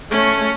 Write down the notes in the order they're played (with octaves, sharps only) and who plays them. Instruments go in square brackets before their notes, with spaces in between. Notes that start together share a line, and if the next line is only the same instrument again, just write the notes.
[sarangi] A3 [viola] C#4